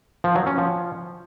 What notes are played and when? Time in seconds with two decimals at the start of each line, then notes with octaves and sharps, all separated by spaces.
0.24 F3
0.35 F#3
0.47 C#4
0.58 F3